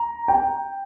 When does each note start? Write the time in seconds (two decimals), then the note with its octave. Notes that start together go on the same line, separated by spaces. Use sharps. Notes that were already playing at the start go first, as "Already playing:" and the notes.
Already playing: A#5
0.28 G5